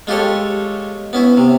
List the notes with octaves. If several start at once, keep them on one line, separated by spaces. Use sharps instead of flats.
G#3 F4 G4 A4 C#5
B3 C#4 E4
C3